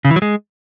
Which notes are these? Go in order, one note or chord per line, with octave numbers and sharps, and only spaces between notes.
C#3
E3
F#3
G#3